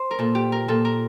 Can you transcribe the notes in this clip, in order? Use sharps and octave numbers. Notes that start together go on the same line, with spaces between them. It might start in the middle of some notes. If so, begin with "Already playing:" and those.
Already playing: C5
A#4
A#2 A4
G4
A#4
A#2 A4
A#4